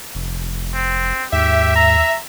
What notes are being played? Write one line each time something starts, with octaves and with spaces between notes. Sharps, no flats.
F1
C4
D#2 G#2 G4 E5
A#5